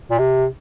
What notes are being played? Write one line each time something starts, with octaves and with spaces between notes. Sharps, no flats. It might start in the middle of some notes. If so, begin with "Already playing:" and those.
A#2
C3